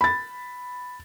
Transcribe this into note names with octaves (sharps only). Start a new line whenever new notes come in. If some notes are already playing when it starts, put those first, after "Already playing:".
B5 A6